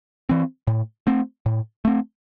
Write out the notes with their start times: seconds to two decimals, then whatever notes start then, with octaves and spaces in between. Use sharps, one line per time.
0.29 E3 C4
0.67 A2
1.07 A3 C4
1.46 A2
1.85 A3 C4